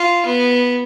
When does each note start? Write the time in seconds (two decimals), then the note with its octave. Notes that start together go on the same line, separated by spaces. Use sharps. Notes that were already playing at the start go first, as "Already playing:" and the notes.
Already playing: F4
0.26 B3